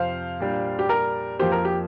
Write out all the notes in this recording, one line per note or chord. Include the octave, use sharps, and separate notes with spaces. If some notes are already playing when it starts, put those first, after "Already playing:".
Already playing: F2 C3 F3 C5 F5
A#2 G3 D4
G4
A#4
F2 F3 A#3 G4 C5
A#4
G4